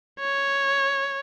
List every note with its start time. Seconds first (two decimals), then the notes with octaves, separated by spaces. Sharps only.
0.20 C#5